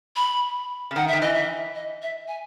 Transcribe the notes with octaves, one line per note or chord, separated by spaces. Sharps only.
B5
C#3
D#3 F#5
E5
D#3
E3 D#5
E5
D#5
E5
G#5